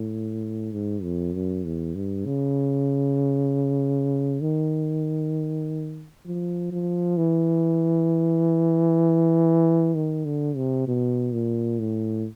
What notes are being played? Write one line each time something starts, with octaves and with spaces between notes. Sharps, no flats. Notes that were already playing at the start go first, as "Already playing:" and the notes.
Already playing: A2
G#2
F2
F#2
E2
G2
C#3
D#3
F3
F3
E3
D#3
D3
C3
B2
A#2
A2